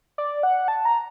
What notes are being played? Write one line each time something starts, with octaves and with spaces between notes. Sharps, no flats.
D5
F#5
A5
A#5